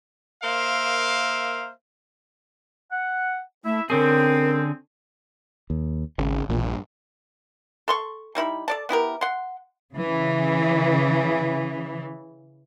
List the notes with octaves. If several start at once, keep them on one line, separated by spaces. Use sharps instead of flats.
A#3 A#4 C5 E5 F5
F#5
A3 E4 E5
D3 C4 C#4 G#4 A#4
D#2
G#1 C#3
E1 A#1 E2 A#2
G2
A4 C6 C#6
G3 D#4 E4 B5
A4 D5 A5
B3 E4 G4 A#4
F#5 C6
C#3 E3